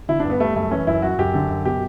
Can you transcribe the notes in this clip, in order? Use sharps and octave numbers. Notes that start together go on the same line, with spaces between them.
D3 E4
D4
G2
B3
G3 A3
F#2 A3
E3 C#4
F#2 E4
F#3 F#4
F#2 G4
D3
F#2
B2 G4